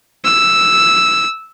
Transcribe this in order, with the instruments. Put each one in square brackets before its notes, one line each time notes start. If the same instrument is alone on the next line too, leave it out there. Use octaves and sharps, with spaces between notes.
[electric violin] E6